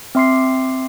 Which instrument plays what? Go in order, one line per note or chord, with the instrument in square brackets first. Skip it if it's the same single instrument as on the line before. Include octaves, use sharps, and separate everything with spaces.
[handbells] C4 E5 C6 D6 C7